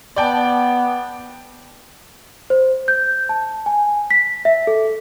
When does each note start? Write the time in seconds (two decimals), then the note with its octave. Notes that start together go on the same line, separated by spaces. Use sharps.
0.16 B3 D5 G5 A5
2.50 C5
2.88 G6
3.29 A5
3.66 G#5
4.11 B6
4.45 E5
4.67 A4